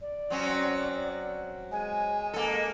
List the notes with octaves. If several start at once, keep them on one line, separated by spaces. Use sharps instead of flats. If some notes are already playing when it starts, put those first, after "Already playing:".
D5
F#3 C4 C#4
G#3 G#5
A#3 A4